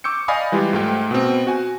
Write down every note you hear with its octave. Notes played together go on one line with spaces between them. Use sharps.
C#6 D6 E6 G6 C#7
D5 D#5 F5 G#5 B5 D#6
E3 G3 G#3 F4 G4
G#2 A3 G5
B2 B3 C4
F#4 G#5